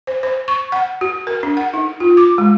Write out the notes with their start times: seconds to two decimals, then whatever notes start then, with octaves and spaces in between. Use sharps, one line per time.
0.07 C5
0.23 C5
0.48 C#6
0.72 F#5
1.01 F#4
1.27 A#4
1.43 D4
1.57 F#5
1.74 D#4
2.00 F4
2.17 D6
2.38 G#3